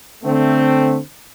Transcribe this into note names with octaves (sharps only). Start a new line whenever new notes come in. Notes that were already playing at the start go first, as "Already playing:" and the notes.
D3 A3 C4